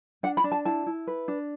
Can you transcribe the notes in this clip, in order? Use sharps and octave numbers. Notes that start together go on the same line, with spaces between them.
D4 F#5
B5
D4
A5
E4 A5
E4
B4
D4